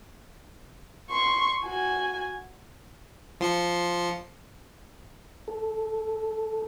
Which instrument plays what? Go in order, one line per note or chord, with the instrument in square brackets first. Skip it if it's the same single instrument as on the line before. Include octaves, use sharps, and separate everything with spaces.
[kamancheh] C6 C#6
F#4 G#5
[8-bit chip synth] F3 C6 C#7
[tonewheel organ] A4